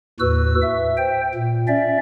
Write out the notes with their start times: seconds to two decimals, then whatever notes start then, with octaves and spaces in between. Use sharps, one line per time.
0.20 D#2 A2 F#4 B4 E6
0.62 E5
0.97 C5 G5
1.35 A#2
1.68 C#4 D5 E5